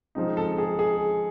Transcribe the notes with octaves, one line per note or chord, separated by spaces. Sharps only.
F3 G#3 C4 D#4
A4
G#4
G#4